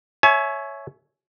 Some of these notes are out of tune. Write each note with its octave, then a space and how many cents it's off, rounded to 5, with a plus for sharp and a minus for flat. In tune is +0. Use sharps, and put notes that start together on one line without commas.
C#5 +0 E5 +0 G#5 +35